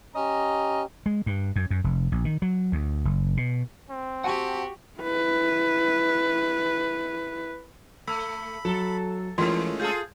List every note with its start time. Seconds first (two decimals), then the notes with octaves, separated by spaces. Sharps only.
0.16 C#4 G4 D#5 A#5
1.06 G#3
1.26 G2
1.56 F#2
1.70 F#2
1.84 F1
2.12 A#1
2.25 D#3
2.42 F#3
2.72 D2
3.05 F#1
3.37 B2
3.90 C4
4.24 F#4 G4 F#5 G#5 A5
5.00 E4 B4
8.07 A3 B5 E6
8.65 F#3 A4
9.38 E3 G#3 A3 C#4 E4 F4 A#4 C6
9.80 F4 G#4 A4 G6